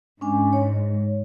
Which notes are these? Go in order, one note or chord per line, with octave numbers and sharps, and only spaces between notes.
G#2 C#4 D4 G#5
C#5